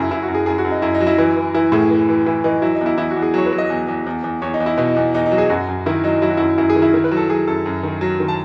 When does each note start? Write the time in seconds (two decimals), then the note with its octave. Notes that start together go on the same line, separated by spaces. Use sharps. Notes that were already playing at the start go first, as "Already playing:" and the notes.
Already playing: F#2 C#3 E4 G#4
0.11 F#2 E4
0.23 F#4
0.28 F#2
0.34 G#4
0.46 F#2 G#4
0.58 F#4
0.65 F#2
0.71 D#4
0.82 F#2 E4
0.94 D#4
1.00 F#3
1.07 E4
1.18 E3 E4
1.36 E3
1.55 E3 E4
1.72 A2 G#4
1.90 E3
2.09 E3
2.26 E3 E4
2.44 E3 D#4
2.62 F#3 E4
2.75 D#4
2.81 E2
2.86 E4
2.98 E2 E4
3.11 F#4
3.16 E2
3.22 G#4
3.34 F#3 C#5
3.46 B4
3.52 F#3
3.58 D#5
3.70 E2
3.88 E2
4.06 E2
4.24 E2
4.42 E2 C#5
4.54 D#4
4.60 E2
4.66 E4
4.78 B2 D#4
4.96 E2
5.14 E2 D#4
5.26 D#4
5.31 F#3
5.38 G#4
5.50 F#2 F#4
5.68 F#2
5.86 D#3 E4
6.04 F#3 D#4
6.22 F#3 E4
6.30 F#4
6.37 F#2 E4
6.58 F#2 E4
6.70 G#4
6.76 D#3
6.82 E4
6.94 D#3
7.04 B4
7.11 F#3
7.17 A4
7.29 F#3 G#4
7.47 F#2 A4
7.66 F#2
7.83 D#3
8.01 F#3
8.20 D#3
8.28 A5